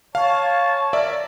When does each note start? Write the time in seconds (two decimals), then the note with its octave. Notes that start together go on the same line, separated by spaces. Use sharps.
0.15 C#5 F5 A5
0.93 A#4 D5 E5